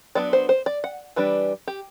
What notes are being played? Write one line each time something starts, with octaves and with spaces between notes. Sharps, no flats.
F#3 B3 D4 D5
C5
C5
D5
F#5
E3 G3 D4 B4
G4